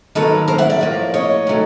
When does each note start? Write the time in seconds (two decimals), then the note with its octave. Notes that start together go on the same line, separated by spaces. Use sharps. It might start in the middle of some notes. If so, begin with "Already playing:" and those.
0.15 D#3 F#3 A#3 A4 B4
0.48 A#4 C5
0.58 E5 F#5
0.70 D5 E5
0.81 A2 F3 A#3
1.14 C#5 D#5
1.47 D#3 F#3 A3